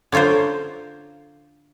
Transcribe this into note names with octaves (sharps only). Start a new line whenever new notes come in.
D3 C#4 F4 A#4 C5